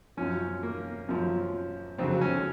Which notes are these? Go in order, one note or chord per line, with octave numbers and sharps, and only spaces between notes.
F#2 F3 C#4
A#3
F#2 F3
F2 C#3 F#3 C4
C#4